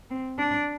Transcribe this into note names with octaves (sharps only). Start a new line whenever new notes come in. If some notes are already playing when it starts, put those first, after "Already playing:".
C4
D4